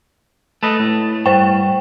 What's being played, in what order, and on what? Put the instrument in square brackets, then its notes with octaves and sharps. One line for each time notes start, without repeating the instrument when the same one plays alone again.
[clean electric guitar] A3 [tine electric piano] A4 B4 D#5
[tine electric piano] A2
[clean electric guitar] G2 [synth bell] C5 G5